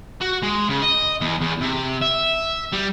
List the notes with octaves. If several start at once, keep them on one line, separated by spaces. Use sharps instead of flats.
F#4
G#3
C#3
D#5
E2
E2
C3
E5
G3